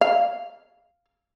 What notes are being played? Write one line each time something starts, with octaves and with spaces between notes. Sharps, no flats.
F5